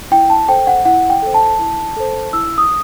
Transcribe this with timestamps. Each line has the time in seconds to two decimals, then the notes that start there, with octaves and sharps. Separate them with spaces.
0.11 E4 G5
0.30 A5
0.48 A4 C5 G5
0.67 F#5
0.85 E4 F#5
1.10 G5
1.22 A4 C5
1.34 A5
1.59 E4
1.96 A4 C5
2.33 E4 E6
2.58 D#6